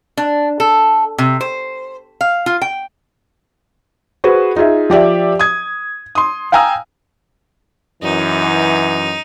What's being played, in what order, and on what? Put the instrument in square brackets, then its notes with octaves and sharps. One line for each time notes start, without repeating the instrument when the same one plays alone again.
[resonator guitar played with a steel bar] D4
A4
C3
C5
F5
F4
G5
[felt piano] F#4 G#4 B4 C5
D#4 F4 G#4 E5
F3 G4 D5 E5
D#6 G#6
C6 D#6
F5 G5 G#5 A#5 D#6 E6
[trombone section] F#2 E3 [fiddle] D#4